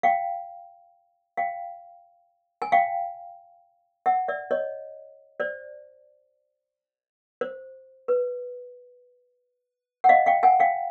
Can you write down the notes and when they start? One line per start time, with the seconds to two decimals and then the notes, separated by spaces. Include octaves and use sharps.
0.03 F5 G5
1.37 F5 G5
2.62 G#5
2.72 F5 G5
4.06 E5 F#5
4.28 D5 E5
4.51 C#5 D#5
5.40 C5 D5
7.41 C5
8.08 B4
10.04 F#5
10.09 D#5 F5
10.26 F5 G5
10.43 F#5 G#5
10.60 F5 G5